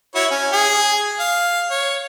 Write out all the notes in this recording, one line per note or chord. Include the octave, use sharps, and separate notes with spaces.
E4 F#4 C#5
C#4
G#4
F5
C#5